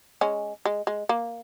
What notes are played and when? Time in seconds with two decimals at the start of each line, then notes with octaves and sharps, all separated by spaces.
0.21 G#3 C#4
0.65 G#3
0.87 G#3
1.09 A#3